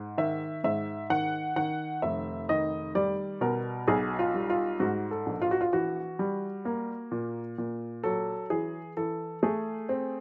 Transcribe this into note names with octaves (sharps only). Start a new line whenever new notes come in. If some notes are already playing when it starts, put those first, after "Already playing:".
Already playing: G#2
D#3 E5
G#2 E5
D#3 F#5
D#3 F#5
F1 E5
D#3 D#5
G3 D5
B2 A#4
B1 G#4
F4
G3
F4
G#2 F#4
A4
A#1
F4
F#4
F4
E3 F#4
G3
A#3
A#2
A#2
F#3 A4
E3 G#4
E3 A4
A3 G#4
C4